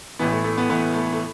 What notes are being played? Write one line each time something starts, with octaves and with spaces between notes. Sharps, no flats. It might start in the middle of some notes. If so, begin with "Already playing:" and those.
A1 A2 E3 B3
A3
A3
B3
A1 A2 E3 B3
A3
A3